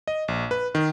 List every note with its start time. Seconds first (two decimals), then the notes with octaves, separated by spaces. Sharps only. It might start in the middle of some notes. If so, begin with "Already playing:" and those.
0.08 D#5
0.28 A#1
0.51 B4
0.75 D#3